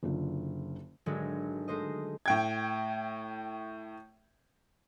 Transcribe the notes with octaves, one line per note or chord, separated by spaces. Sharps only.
F#1 D3 F4
G#1 D3 F#3 G#3
G#3 A3 C5 D#5
A2 G5 G#6